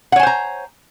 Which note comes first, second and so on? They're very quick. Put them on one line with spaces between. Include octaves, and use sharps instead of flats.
F#5 C#5 G#5 C5 A#5